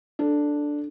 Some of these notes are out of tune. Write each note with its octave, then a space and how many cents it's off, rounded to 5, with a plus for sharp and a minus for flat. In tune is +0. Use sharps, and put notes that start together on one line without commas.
D4 +0 A4 +0